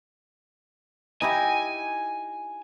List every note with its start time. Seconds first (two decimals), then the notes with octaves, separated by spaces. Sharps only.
1.22 D#4 E4 G4 G#5